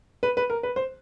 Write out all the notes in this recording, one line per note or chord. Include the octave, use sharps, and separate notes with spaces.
B4
B4
A#4
B4
C5